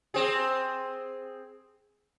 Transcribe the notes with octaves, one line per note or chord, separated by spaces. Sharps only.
C4 G#4